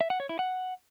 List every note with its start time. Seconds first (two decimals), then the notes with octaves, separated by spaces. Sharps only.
0.01 E5
0.10 F#5
0.20 C#5
0.29 E4
0.39 F#5